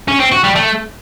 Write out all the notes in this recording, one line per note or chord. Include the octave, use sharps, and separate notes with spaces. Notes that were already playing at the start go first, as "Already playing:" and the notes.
C#4
C4
F#4
G3
A3